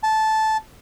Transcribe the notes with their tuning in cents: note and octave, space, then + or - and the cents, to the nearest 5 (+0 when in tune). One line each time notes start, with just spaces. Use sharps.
A5 -10